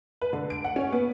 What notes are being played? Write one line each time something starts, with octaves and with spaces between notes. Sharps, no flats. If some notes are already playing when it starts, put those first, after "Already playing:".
B4
D3
D7
F#5
C#4
B3